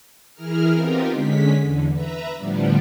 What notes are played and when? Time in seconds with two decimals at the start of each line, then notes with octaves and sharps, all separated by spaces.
0.34 E3 E4 G#4 A#4 F6
0.72 B3 C4 D#4 F4 G4 A#4
1.12 D3 G#3 C#4 B6
1.61 E2 D3
1.92 B4 E5 A#5
2.36 A2 D3 F3 G3 B3 D4